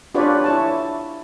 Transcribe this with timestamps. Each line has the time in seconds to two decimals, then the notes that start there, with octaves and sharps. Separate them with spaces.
0.15 D4 F4 G4 B4 C#5 D5
0.44 E4 C#5 A5